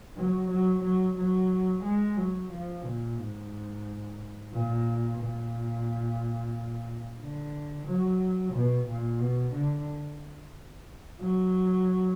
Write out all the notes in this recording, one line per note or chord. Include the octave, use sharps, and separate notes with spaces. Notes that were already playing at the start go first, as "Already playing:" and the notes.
F#3
F#3
F#3
F#3
G#3
F#3
F3
A#2
G#2
A#2
A#2
D3
F#3
B2
A#2
B2
D3
F#3